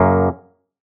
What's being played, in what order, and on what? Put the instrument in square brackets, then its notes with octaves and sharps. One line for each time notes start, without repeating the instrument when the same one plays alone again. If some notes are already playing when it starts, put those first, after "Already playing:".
Already playing: [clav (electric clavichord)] F#2 C#3 A#3